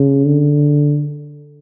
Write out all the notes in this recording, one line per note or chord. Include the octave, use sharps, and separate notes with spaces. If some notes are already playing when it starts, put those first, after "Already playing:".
Already playing: C#3
D3